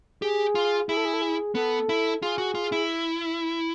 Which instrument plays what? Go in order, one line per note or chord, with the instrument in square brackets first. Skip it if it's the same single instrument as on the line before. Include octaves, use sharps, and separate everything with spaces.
[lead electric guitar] G4 [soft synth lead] G#4
[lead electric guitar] F4
[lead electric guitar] E4 [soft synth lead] G#4
[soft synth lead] A4
G#4
A4
G#4
[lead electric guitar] B3 [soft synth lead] A4
[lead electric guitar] E4
[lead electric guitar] F4 [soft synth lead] G#4
[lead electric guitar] F#4
F4
E4